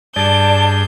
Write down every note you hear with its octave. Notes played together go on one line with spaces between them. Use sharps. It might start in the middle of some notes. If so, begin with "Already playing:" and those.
G2 G#4 D5 A5 G6